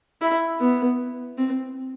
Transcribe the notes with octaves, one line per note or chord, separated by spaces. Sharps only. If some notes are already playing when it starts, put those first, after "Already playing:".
E4
B3
C4